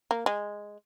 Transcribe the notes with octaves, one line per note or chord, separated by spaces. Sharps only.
A#3
G#3